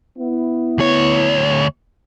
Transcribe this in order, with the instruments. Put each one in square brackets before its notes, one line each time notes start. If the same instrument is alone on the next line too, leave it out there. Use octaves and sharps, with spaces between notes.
[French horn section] B3 E4
[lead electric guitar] D2 C#5